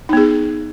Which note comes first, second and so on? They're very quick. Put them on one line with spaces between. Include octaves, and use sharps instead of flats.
D#4 B3 G#4